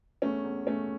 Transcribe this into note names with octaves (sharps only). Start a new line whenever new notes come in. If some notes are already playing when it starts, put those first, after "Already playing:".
E2 A3 C#4
E2
E2 A3 C#4